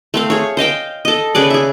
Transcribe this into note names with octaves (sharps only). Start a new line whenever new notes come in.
A3 C4 F5
G#4 C#5
C5 D#5 F5 G5
A4 D#5
C#3 G#4 B4 D5
G#4 E5